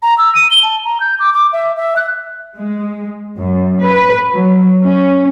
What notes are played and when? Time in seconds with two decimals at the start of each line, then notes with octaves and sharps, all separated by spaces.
0.02 A#5
0.18 E6
0.35 D#7
0.51 G7
0.63 A5
0.85 A#5
1.00 G6
1.20 D6
1.34 D6
1.53 E5
1.76 E5
1.97 F#6
2.57 G#3
3.37 F#2
3.82 B4
4.31 F#3
4.83 C#4